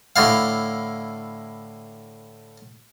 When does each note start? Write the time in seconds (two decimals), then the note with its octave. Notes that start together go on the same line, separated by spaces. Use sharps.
0.16 A2 D3 E4 F5